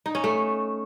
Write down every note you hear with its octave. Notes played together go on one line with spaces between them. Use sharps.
D#4
C#4
A3